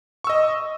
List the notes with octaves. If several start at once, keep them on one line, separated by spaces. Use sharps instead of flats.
D#5 C#6 E6